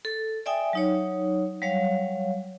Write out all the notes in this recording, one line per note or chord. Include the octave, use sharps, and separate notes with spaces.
A4
D5 E5 G5 G#5 D#6
F#3 D#4 C#5
F#3 G3 C#5 F5